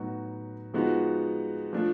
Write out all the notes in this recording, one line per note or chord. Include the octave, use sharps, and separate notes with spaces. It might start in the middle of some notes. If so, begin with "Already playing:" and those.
Already playing: A2 F#3 B3 D#4 F#4
F3 G#3 B3 D#4 F#4
F3 A3 D4